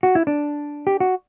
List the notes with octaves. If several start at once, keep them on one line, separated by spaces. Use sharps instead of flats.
F#4
E4
D4
G4
F#4